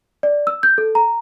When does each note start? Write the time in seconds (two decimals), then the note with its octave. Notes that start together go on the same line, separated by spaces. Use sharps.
0.23 D5
0.47 E6
0.63 G6
0.78 A4
0.95 A#5